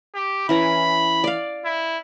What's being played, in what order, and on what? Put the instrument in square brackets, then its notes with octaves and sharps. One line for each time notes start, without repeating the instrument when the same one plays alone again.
[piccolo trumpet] G4
[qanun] E3 C#4 A#5 [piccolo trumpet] B5
[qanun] D5 F5
[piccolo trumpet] E4